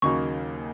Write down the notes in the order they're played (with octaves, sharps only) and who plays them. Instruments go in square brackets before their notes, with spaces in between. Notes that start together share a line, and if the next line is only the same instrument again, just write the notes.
[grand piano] D#2 C#3 F#3 A#3 D#4 [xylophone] C#6